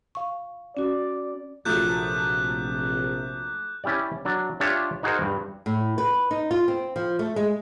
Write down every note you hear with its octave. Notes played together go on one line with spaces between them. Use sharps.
F5 C#6
C#4 F#4 D5
A#1 C3 F3 F#3 A3 D6 F#6 G6
C#4 E4 G4 D5
F#3 D4
D4 F4 G4 C#5 E5
D#4 F#4 G#4 A#4 C5
G2
A2
B4
D#4
F4
C4
F3
A3
G#3